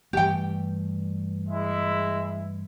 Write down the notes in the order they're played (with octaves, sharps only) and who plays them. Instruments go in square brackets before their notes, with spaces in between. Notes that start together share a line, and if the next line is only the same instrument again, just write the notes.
[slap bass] G2 E3 A3 [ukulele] G4 G5
[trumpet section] G#3 E4 E5